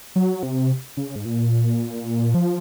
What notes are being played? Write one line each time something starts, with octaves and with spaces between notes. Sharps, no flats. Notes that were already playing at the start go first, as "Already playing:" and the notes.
F#3
C3
C#3
G#2
A#2
F3